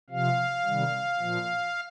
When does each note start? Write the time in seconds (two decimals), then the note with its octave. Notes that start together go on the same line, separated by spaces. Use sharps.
0.10 C3 F3 F5
0.64 C3 D#3 G3
1.18 A#2 F3